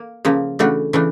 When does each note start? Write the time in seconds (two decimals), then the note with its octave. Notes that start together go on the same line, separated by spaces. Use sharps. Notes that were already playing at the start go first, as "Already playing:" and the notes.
Already playing: A#3
0.25 C#3 F3 A#3
0.59 C#3 E3 A3 D4 F#4
0.93 C#3 E3 A3 D4